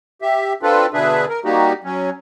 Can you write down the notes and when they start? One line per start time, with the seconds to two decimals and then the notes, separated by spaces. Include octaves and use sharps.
0.22 G4 E5
0.63 C4 D4 F4 A4 B4
0.94 B2 D3 D4 G#4 B4 E5
1.29 A#4
1.45 G3 A#3 D#4 F#4 G4
1.84 F#3 C#4